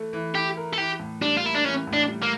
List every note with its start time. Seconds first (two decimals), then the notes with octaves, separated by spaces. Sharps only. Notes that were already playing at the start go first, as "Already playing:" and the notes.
Already playing: E3 A3
0.13 E3
0.35 E4 G4
0.57 A#4
0.73 A4
0.78 E3 G4
1.00 A2
1.21 G3 D4
1.37 F4
1.44 A#3 E4
1.55 D4
1.65 E3 C#4
1.87 A2
1.93 D4
2.08 G3
2.23 A#3